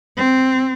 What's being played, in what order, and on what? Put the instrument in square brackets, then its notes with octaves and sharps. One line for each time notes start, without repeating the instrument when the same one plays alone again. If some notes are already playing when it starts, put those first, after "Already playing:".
[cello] C4